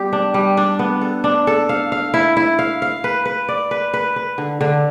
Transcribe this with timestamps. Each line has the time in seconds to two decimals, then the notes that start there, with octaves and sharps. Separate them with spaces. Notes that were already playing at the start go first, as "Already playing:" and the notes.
Already playing: G3 B3 G4
0.13 D4
0.34 G3
0.57 D4
0.79 B3
1.01 A4
1.24 D4
1.47 A4
1.69 F5
1.92 F5
2.14 E4
2.37 E4
2.59 F5
2.82 F5
3.04 B4
3.26 B4
3.49 D5
3.71 B4
3.94 B4
4.16 B4
4.38 D3
4.61 D3